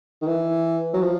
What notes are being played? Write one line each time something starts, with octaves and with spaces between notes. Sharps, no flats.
D#3
E3
F#3
F3